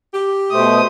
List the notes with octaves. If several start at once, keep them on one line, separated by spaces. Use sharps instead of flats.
G4
B2 A3 C5 D#6